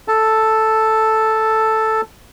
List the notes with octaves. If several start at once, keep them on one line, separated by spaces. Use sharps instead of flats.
A4 A5